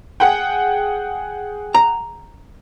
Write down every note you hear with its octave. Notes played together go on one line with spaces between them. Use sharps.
G#4 F#5 G5
A#5